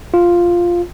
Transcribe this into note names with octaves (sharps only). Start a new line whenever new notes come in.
F4